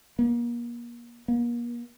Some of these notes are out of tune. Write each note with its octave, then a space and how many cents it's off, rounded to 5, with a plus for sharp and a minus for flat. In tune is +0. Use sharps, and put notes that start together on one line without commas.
A#3 +35
A#3 +40